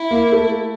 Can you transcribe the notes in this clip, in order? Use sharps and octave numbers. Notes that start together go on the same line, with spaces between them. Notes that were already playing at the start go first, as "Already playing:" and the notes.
Already playing: E4
A#3
A3